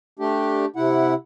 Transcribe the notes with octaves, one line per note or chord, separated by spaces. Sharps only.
A3 D4 G4
C3 E4 F#5